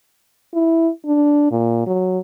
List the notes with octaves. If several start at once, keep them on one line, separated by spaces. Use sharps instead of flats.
E4
D4
A#2
F#3